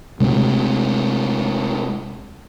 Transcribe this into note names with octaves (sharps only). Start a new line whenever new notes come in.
C3 G#3 A3 C4